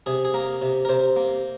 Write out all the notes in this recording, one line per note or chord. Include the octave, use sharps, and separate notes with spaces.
C3 G#4
G#4
A#3 A#4
C3
A#4
C3 C5
A#3